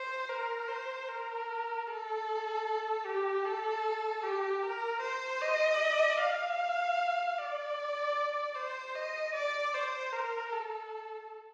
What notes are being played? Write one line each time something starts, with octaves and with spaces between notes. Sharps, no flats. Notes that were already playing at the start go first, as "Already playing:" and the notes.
Already playing: C5
A#4
C5
A#4
A4
G4
A4
G4
A#4
C5
D#5
F5
D5
C5
D#5
D5
C5
A#4
A4